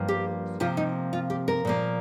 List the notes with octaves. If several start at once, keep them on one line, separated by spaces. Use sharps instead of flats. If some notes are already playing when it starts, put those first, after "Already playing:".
Already playing: G2 F3 A#3
G4
C3 F3 A#3 F4
D#4
F4
G4
A#4
A#2 F3 A#3